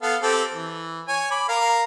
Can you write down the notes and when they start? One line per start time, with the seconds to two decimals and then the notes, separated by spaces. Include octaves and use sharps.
0.02 B3 A4 F5
0.22 C4 G4 A4
0.54 E3
1.08 C#5 G#5
1.31 B5 D6
1.49 A#4 F5 A#5